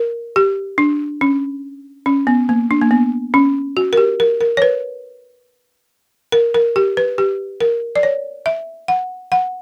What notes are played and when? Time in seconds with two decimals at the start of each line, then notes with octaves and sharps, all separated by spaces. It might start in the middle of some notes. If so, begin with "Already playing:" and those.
Already playing: A#4
0.36 G4
0.78 D4
1.21 C#4
2.06 C#4
2.27 B3
2.49 A#3
2.71 D4
2.81 A#3
2.91 B3
3.34 C#4
3.77 F#4
3.93 A#4
3.97 G4
4.20 A#4
4.41 A#4
4.57 C#5
4.62 B4
6.32 A#4
6.55 A#4
6.76 G4
6.97 B4
7.18 G4
7.61 A#4
7.96 D5
8.03 C#5
8.46 E5
8.88 F#5
9.32 F#5